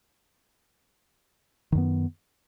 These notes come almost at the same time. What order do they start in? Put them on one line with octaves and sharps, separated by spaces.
D#3 F#2 B3